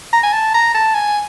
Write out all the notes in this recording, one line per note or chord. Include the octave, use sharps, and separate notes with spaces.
A#5
G#5
A5
A#5
A5
G#5